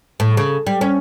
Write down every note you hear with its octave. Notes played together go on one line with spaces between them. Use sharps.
A2
C#3
G3
C#4